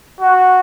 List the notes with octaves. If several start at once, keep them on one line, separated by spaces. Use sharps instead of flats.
F#4